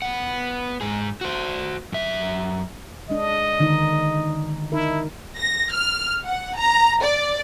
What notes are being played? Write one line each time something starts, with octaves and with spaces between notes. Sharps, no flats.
B3 F#5
G#2 G#4
F#4 C5
F#2 E5
G#3 D4 D#5
D3 D#3 D#4
D#4 E4 A#4
A#6
F6
F#5
A#5
D5